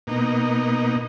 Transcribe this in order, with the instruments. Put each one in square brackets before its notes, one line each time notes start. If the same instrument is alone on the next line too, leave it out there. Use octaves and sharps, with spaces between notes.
[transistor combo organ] B2 A#3 D#4